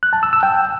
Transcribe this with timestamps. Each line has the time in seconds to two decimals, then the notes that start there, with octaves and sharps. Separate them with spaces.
0.03 F#6
0.13 A5
0.23 E6
0.33 E6
0.43 G5